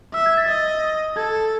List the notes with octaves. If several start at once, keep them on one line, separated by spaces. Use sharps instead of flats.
E5 E6
G#6
A6
D#5 A6
A4 G#6